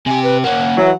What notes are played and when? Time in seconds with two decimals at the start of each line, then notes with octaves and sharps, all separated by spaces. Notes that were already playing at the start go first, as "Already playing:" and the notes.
0.06 C3 G4 G#5
0.23 B4
0.44 A#3 C#4 F#5
0.78 E3 F#3